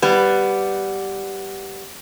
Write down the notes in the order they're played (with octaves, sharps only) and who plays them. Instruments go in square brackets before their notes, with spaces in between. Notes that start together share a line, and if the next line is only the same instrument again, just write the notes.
[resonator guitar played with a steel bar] G3 B3